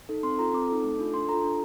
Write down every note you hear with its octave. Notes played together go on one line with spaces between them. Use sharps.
D#4 A4
C4 C6
F4 A4 A#5
C4 D6
D#4 A4
A3
D4 F4 A4
D4 C6
F4 A4 A#5
D4